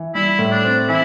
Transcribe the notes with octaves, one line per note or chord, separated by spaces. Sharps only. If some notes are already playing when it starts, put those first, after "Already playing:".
Already playing: E3
G3 E4
A2
D4
C4
E3 E4